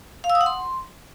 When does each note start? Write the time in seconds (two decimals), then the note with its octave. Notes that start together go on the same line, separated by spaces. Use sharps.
0.24 F5
0.30 E6
0.35 D#6
0.41 F#5
0.46 C6